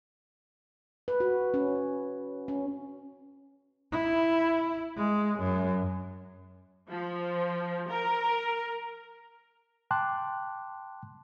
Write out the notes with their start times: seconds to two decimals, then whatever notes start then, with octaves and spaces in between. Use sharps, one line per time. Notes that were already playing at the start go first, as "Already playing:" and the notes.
1.08 B4
1.20 F#4
1.54 C#4
2.48 C#4
3.92 E4
4.97 G#3
5.39 F#2
6.88 F3
7.88 A#4
9.91 G5 A5 C6 D6 F#6